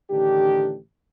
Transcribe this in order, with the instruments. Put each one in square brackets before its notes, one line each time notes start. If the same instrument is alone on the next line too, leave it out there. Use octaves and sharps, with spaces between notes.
[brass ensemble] A1 D3 D#3 D4 G4